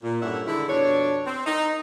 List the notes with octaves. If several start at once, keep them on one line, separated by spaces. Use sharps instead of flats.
A#2
G2 C#4 E4 A4 E5 F#5
D3 D#3 G#3 E4
F2 B2 D4 C#5
C4
D#4